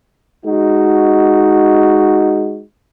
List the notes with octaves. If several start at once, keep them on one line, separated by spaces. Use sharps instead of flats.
G#3 D#4 F#4